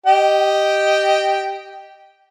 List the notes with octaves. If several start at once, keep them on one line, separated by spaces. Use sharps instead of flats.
G4 D#5 G5